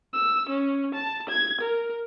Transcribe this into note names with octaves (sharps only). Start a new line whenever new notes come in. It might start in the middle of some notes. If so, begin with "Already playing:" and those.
E6
C#4
A5
G#6
A#4